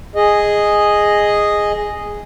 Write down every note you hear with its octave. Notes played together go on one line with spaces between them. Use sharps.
G#4 D#5